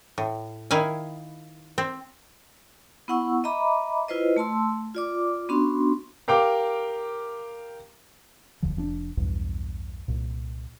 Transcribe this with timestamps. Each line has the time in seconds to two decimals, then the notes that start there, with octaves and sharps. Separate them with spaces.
0.18 A2
0.71 D#3 E4 F5 G#5
1.78 C4
3.08 B3 E4 F#5 C#6 E6
3.44 D#5 E5 A#5 B5 D6
4.08 E4 F4 B4 C5 D#5
4.36 A3 A5 C6 E6
4.95 F4 D5 D6
5.49 B3 C#4 D4 F#4 C6
6.28 G4 A#4 F5 G5 D6
8.62 F1 D2 D3 F3
8.76 F1 F3 C#4 D4
9.17 B1 E2 G2
10.08 C2 A#2